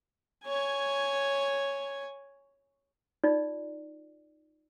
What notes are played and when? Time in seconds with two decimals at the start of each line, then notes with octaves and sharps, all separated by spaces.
0.47 C#5 G#5
3.24 D#4 F4 D5